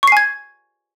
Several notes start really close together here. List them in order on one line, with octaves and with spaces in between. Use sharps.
C#6 C7 G#5 G#6